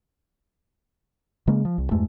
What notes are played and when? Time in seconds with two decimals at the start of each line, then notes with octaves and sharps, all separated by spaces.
1.47 C#3 G#3 A#3
1.65 F3
1.78 C2
1.91 E2 G2 G#3 A3